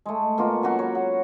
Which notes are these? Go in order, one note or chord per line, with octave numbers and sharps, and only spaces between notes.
G#3 A3
B2 A#3 F4 F#4
F#3 C#4 F#4 F#5
C#5 B5
F#5